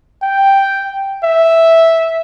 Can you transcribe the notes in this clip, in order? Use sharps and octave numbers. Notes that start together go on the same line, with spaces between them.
G5
E5